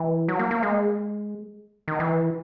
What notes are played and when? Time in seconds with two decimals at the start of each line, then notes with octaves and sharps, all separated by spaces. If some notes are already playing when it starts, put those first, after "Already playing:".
Already playing: E3
0.28 F#3
0.39 A#3
0.51 A#3
0.63 G#3
1.88 D#3
2.00 E3